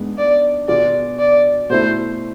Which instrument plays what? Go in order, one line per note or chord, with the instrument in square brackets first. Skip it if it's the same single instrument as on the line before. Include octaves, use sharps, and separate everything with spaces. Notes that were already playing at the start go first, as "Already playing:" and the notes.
Already playing: [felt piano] G#2 G#3 B3 D4
[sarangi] D5
[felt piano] B2 B3 F4 G#4 [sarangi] D5
[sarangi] D5
[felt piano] B2 A3 E4 [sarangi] C5